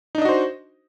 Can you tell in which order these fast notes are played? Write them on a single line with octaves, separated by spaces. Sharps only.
D#4 D4 D#5 F#4 C5